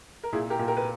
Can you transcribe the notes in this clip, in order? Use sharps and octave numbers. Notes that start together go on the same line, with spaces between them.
A#4
A#2 E4 G#4
G4 A#4
A#2
G4 A#4
B4